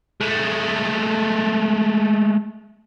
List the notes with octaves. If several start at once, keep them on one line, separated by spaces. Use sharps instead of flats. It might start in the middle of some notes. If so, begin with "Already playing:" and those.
G#3 A3